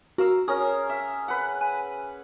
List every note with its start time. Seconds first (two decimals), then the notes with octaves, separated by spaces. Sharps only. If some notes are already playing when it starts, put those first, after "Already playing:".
0.18 F#4 A#4 F5 E6
0.48 C#4 G#4 A#4 D#6
0.89 E5
1.28 B4 F#5
1.61 G#5